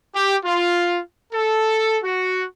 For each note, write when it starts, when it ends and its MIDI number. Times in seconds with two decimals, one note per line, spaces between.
0.15 0.36 67
0.44 0.99 65
1.33 1.98 69
2.04 2.43 66